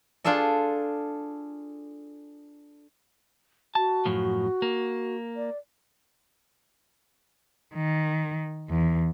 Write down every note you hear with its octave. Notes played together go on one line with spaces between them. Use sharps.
D4 F4 G#4 A4 D5
F#4 A5
F#2 A2 F3
A#3
D5
D#3
E2